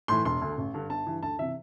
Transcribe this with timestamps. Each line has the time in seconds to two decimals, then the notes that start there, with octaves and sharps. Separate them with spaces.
0.08 A2 E3 C6
0.25 E1 C6
0.42 D2 D3
0.58 A1
0.74 G2 D3
0.90 G1 A5
1.07 G2 E3
1.23 D2 A5
1.39 C3 E3 E5